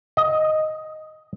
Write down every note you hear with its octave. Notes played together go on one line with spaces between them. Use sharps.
D#5